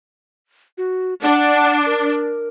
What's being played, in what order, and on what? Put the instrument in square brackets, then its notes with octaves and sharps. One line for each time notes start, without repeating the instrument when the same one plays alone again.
[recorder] F#4
[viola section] D4 [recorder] F#5
[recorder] A#4